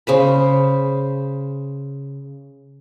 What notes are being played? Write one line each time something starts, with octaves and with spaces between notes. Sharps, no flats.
C#3 C5 B5